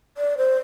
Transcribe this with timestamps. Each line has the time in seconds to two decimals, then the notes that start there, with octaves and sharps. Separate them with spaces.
0.17 D5
0.37 C5